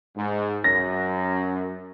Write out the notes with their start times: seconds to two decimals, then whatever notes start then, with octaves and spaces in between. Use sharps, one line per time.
0.17 G#2
0.64 F#2 A#6